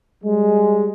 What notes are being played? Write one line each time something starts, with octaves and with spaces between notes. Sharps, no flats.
G3 G#3